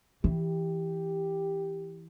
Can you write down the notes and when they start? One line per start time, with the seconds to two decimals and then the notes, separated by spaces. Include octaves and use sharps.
0.24 E3 G4